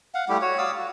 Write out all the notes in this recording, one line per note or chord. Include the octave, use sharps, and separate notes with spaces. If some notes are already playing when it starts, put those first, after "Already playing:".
F5 F#5
G3 A3 E4 G4
F#4 C#5
D5 F5 D#6 E6
F#4